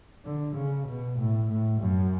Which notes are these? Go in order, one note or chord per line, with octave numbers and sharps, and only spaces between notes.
D3
C#3
B2
A2
A2
F#2